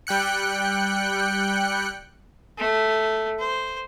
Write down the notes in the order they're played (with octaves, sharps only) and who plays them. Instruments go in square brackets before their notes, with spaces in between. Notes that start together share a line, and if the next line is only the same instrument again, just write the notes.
[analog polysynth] G3 G5 F#6 C#7
[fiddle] A3
C5